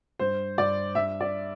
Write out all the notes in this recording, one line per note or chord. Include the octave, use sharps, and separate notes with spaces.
G2 C5
G2 D5
G2 E5
D5